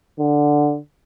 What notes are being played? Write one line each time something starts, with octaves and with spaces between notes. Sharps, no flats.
D3